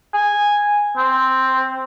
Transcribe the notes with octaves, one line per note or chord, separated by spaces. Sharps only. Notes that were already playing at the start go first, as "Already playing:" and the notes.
G#5
C4